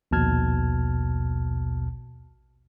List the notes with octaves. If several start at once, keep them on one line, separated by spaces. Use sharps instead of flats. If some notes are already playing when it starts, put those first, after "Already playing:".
A#1 D#2 B2 A5 F6 G#6